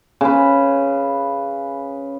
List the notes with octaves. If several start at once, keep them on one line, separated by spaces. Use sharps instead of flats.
C#3 B4